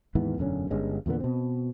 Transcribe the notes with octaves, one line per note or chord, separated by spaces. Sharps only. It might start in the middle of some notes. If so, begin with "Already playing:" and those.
D#2 G#2 E3 B3
E1 F#2 D3 C#4
G1 G2 G#3 C#4
E2 A#2 D3 B3
B2 C4